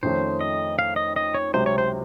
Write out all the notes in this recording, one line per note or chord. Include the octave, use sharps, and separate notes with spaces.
F2 D#3 A3 C#4 C5
D#5
F5
D#5
D#5
C#5
C#2 C3 F#3 C4 C5
C#5
C5